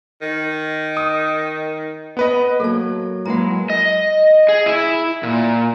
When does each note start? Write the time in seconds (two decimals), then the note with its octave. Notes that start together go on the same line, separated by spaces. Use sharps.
0.22 D#3
0.97 D#6
2.17 B3 B4 D#5
2.60 F#3 A#3 A4 A5
3.26 F#3 G#3 A#3 E4 B4 F#5 A#5
3.70 D#5
4.49 G#4
4.66 E4
5.23 A#2